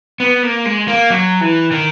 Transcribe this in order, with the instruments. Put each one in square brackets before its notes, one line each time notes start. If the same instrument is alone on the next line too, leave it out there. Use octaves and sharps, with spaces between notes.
[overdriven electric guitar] B3
A#3
G#3
A#3
F#3
E3
D#3